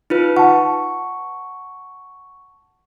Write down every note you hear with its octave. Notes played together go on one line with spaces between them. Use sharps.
D#4 F4 B4
F#5 A5 C#6